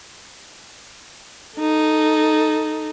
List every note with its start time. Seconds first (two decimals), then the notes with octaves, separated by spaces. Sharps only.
1.58 D#4 A4